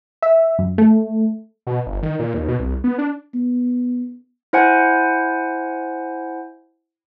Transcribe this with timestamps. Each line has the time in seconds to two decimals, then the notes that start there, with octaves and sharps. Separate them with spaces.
0.22 E5
0.59 F#2
0.78 A3
1.67 B2
1.86 G1
2.03 D#3
2.19 A#2
2.34 D#2
2.48 B2
2.59 C2
2.84 B3
2.98 D4
3.34 B3
4.53 E4 C5 F#5 G#5